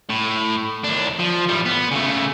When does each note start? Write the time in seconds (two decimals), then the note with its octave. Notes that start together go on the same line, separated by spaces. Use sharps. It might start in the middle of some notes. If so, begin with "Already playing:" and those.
0.09 A2
0.84 D#2 D4
1.19 F3
1.48 A2 G3
1.65 B3
1.92 C#3 A3